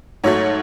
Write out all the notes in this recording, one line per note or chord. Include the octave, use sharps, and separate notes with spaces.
G#2 F#3 A3 C#5